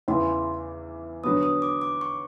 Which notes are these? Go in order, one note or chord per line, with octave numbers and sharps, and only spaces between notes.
E2 C#3 E3 C6
D3 F#3 B3 D#6
D#6
D6
D6
C#6